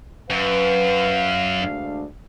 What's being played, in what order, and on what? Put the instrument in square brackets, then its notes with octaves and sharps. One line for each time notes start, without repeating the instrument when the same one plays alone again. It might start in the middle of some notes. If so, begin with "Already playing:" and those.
[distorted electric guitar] F#2 [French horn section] B4 [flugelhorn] F5
[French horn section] D2 G#3 D4